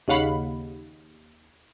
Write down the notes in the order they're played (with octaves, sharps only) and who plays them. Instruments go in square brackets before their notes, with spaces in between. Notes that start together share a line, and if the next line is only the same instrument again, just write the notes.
[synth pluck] D#2 C#3 F5 F#5 B5